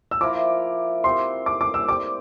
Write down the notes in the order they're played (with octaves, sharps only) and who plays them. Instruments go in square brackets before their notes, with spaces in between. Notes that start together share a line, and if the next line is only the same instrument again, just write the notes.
[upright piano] E6
[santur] F3 A#3 E4 A#4 [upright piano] D6
[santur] C4 G4 A#4 [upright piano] C6
[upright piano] D6
D6
E6
[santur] C4 G4 D5 [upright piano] D6